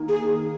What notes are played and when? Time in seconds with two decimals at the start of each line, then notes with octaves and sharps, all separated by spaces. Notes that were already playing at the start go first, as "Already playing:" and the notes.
Already playing: D#3 A#3
0.08 G#4